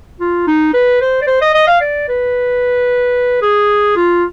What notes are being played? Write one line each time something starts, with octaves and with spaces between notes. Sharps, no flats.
F4
D#4
B4
C5
D5
C5
D#5
D#5
F5
D5
B4
G#4
F4